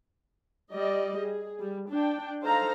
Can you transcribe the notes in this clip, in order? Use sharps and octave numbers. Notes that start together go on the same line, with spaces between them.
G3 D5 D#5
G#4
G3
D4 G5
D#4 A4 C5 F5 A#5